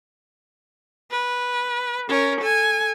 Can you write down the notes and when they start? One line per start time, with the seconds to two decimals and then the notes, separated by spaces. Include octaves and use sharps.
1.11 B4
2.08 C#4 A#4
2.41 A4 G#5